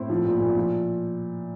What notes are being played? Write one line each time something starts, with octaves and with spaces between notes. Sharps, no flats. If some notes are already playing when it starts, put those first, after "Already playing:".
Already playing: A2 C4 E4
F3
A#2
A#2
F3